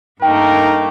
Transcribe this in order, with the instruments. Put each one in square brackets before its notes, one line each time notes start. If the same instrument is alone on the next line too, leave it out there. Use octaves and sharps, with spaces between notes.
[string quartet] G2 A3 A#3 [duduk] D#4 [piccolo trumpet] A#4 [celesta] G5